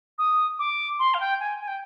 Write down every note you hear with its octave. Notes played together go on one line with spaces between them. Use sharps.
D#6
D6
C6
F5
G5
G#5
G#5
G5